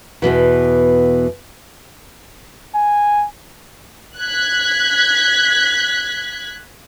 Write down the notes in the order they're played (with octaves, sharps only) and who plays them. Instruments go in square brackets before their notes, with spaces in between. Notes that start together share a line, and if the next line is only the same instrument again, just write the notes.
[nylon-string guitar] E2 G2 B2 E3
[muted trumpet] G#5
[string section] F#6 G#6 B6